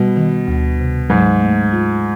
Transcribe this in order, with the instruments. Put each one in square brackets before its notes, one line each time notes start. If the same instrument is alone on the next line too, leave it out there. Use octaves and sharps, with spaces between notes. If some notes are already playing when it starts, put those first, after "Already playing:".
Already playing: [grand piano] B2 [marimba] G3
[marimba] D#3
D2
C3
[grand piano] G#2 [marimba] F#3
[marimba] A3
F4